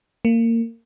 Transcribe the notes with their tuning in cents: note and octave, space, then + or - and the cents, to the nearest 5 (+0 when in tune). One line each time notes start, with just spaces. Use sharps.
A#3 -25